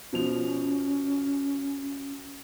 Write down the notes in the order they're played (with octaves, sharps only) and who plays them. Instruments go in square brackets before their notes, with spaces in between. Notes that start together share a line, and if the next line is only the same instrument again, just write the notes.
[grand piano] B2 F3 F7 [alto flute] C#4